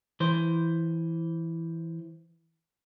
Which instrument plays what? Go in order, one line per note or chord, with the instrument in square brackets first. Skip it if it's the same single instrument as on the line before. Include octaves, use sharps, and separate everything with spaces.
[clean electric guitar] E3 C5